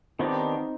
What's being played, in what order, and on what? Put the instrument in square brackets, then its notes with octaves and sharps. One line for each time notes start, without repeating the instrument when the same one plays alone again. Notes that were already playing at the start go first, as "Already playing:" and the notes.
[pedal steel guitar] D#3 B3 D4 G4 [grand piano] C4 D#4